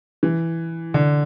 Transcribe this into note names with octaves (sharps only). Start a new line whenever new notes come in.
E3
D3